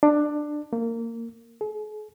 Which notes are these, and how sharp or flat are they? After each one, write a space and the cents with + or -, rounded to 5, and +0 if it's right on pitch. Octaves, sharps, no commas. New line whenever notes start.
D4 +15
A#3 -20
G#4 +45